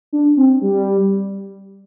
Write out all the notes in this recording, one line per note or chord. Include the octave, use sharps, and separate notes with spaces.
D4
C4
G3